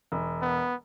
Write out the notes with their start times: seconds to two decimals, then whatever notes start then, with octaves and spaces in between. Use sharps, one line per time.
0.12 E1
0.42 B3